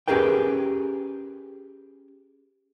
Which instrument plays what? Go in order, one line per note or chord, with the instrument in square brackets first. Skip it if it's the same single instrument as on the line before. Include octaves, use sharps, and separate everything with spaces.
[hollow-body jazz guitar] C#4 G4 G#4 A#4 B4 G5